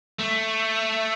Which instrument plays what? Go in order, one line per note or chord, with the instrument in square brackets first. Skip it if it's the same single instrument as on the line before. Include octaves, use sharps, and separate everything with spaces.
[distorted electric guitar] A3